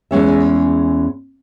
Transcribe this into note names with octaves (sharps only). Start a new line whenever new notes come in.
E2 G#3 C#4 E5